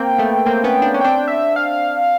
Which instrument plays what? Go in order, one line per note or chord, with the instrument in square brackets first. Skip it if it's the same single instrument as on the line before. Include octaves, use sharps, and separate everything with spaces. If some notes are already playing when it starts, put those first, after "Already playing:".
Already playing: [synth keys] A#3 C4 [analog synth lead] G5
[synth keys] A3 B3
[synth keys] A#3 C4 [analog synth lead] G5
[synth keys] B3 C#4
D4
C#4
[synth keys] C4 D4 [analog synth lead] G5
[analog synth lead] E5
F5